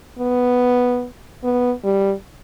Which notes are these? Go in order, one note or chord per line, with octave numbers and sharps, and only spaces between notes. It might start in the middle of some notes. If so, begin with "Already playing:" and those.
B3
B3
G3